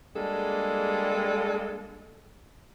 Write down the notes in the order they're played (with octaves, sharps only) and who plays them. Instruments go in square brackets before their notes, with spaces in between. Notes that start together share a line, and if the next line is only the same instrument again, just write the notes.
[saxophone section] G3 G#3 A#3 D4 G#4 A4